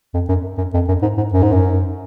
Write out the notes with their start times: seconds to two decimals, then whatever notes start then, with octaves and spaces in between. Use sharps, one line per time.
0.14 F2
0.29 F#2
0.58 F#2
0.74 F2
0.88 F#2
1.02 G#2
1.17 G#2
1.33 F#2
1.42 G#2
1.52 F#2